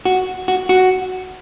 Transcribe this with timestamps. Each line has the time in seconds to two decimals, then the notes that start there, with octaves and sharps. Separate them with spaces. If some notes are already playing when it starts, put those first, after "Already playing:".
0.05 F#4
0.48 F#4
0.69 F#4